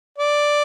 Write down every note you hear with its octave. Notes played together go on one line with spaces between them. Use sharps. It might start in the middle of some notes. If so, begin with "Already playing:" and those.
D5